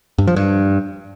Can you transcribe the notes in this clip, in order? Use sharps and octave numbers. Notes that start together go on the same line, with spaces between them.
G2
F3
G2